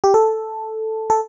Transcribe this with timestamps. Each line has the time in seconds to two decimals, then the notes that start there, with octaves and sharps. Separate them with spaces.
0.04 G4
0.14 A4
1.10 A4